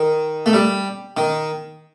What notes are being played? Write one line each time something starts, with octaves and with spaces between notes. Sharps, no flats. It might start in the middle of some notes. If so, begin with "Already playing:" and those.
Already playing: D#3
A3
G3
D#3